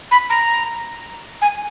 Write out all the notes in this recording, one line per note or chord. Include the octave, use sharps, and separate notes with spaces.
B5
A#5
G#5